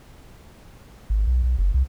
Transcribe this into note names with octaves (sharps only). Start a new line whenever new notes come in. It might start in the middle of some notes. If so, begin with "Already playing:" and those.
G#1
B1
B1
F#1
C2